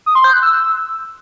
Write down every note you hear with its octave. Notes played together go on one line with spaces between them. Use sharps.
D#6
C6
G6
F#6
E6